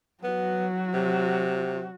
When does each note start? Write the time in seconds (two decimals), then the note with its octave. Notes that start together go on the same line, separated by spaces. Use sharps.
0.24 F#3 B3 F#4
0.94 C3